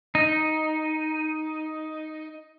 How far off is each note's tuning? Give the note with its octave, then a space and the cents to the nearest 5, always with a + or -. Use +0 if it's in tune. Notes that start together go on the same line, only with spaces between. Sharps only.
D#4 +5